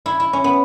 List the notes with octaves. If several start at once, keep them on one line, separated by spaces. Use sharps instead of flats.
E4
E4
C#4
B3